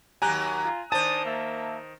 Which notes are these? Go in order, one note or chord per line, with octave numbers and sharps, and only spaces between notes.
D#2 F#3 G4 G#5 A#5 F#6
F4
D#3 D4 C5 G#5 A5 D#6 A6
A#3 E5